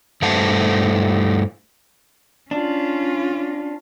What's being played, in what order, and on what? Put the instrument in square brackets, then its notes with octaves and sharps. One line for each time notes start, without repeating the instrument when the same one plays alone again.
[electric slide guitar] G2 A3 C5 F#5 A5
[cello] C#4 F4 [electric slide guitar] D4